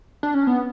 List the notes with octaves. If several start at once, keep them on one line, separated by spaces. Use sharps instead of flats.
D4
C#4
B3